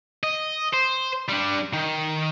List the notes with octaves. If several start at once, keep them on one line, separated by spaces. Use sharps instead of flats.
D#5
C5
G3 D4
D#3